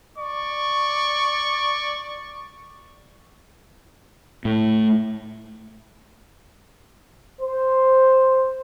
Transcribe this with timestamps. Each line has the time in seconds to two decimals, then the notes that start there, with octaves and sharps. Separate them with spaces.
0.17 D5 C#6
4.45 A2
7.40 C5